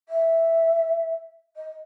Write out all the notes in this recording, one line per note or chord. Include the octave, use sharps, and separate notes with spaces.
E5
D#5